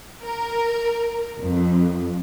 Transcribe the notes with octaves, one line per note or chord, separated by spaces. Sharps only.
A#4
F2